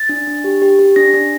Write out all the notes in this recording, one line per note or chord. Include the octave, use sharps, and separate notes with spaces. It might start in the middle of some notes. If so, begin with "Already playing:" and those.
Already playing: A6
D4
D4
G4
G4
G4
D4 A#6
D4